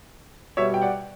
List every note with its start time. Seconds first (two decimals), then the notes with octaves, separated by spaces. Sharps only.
0.57 B2 G3 C#5 E5
0.74 G5
0.82 D5 F#5